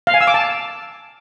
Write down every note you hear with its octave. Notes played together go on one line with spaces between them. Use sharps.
F5
G#5
E6
D6
A5